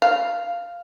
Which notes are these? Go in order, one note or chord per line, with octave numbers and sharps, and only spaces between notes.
F5